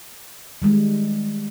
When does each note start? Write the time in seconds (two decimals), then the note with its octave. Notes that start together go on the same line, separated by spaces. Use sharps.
0.62 D#3 G3 G#3